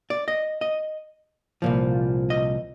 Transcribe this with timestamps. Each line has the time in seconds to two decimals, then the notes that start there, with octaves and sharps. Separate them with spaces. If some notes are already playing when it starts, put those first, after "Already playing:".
0.10 D5
0.28 D#5
0.61 D#5
1.62 C2 A#2 F3
2.30 D#5